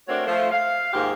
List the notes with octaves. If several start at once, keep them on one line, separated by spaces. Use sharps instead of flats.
A3 C4 D4 F#4 A#4 C#5
F3 A3
F5
D#2 G#2 F4 G4 G#4 F5